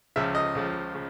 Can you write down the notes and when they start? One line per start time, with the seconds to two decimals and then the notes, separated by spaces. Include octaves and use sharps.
0.16 C#2 C#3 F3 E5
0.35 D#5
0.55 C#2 C#3 F3
0.95 C#3